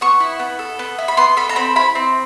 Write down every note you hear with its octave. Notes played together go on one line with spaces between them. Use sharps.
B3 C#6
E4
B3
A4
B3
E4
B5
B3 C6
A4 B5
A#5
C4 B5
E4 B5
C4